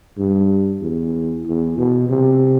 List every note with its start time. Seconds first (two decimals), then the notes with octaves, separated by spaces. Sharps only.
0.18 G2
0.82 E2
1.46 E2
1.78 B2
2.09 C3